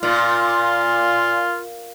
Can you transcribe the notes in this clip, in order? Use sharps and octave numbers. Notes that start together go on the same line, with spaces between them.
A#2 F4